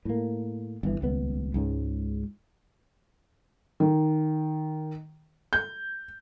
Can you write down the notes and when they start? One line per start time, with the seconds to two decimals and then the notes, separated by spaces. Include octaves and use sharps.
0.05 A2 A#3
0.83 G1 E3
1.01 D#1 C#2 B3
1.54 C#2 G#2 C#3
3.80 D#3
5.53 G6